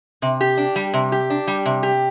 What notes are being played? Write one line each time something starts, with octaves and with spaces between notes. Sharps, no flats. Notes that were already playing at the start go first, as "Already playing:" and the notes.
C3
G4
D4
G3
C3
G4
D4
G3
C3
G4